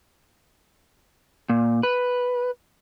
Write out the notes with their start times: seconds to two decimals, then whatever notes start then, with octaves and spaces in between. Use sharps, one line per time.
1.50 A#2
1.83 B4